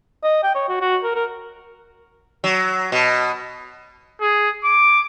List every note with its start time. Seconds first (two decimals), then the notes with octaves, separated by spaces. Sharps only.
0.24 D#5
0.43 G5
0.55 C#5
0.69 F#4
0.81 F#4
1.03 A#4
1.15 A#4
2.44 F#3
2.92 B2
4.21 G#4
4.64 D6